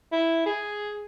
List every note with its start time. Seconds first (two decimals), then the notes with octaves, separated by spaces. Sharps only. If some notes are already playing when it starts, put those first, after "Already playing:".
0.12 E4
0.46 G#4